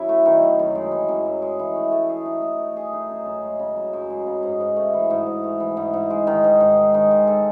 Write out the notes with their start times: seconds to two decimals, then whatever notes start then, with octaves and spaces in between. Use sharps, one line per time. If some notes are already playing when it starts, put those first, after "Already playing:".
Already playing: F#2 E4
0.09 A3
0.25 D#3
0.42 F#2
0.59 F#2
0.75 G#3
0.91 E3
1.08 F#2
1.25 F#2
1.42 G#3
1.59 E3
1.76 A3
1.92 A3
2.09 G#4
2.25 D#4
2.42 A3
2.59 A3
2.77 G#4
2.93 D#4
3.10 F#2
3.26 F#2
3.43 G#3
3.60 C#3
3.76 F#2
3.93 F#2
4.10 G#3
4.27 C#3
4.43 G#2
4.60 G#2
4.76 A3
4.93 E3
5.10 G#2
5.26 G#2
5.44 A3
5.60 E3
5.77 G#2
5.93 G#2
6.10 G#3
6.27 D#3
6.44 G#2
6.60 G#2
6.77 G#3
6.94 D#3
7.11 G#3
7.27 A4